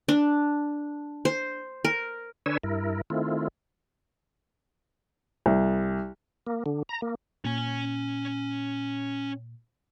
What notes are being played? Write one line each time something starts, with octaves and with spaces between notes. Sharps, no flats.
D4
C5
A#4
D3 D4 B4 C#5 G#5 E6
G2 E4 A#4
D#3 A3 C4 E4 F4
C2
A#3
D3
A#5
A#3
A#2 C#4 G#5